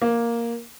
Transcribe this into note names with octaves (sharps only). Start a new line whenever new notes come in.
A#3